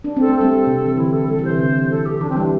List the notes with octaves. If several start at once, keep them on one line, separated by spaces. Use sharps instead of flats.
D4
C4 A4
A3
A4
G3 C4
C3
E3
D3 E4
A4
G3 A4
E3
C3 C5
D3
A4
G4
E3 D4
C4
E3
G3 D4